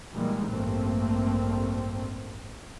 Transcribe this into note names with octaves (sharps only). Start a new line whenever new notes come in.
A#2 D#3 E3 G3 G#3 A#3
A1 G2 A3 A#3 C4